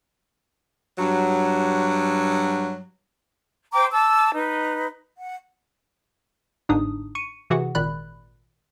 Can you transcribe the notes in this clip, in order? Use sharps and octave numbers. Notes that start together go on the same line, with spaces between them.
G2 F#3
C5 G5 A#5 D6
A5 D6 E6
D#4 B4
F#5
G1 G#2 D4 D#4 D#6
C#6 C#7 D#7
C3 E3 F#4 G#4 F#5
G#1 A#2 D#3 D5 B5 F#6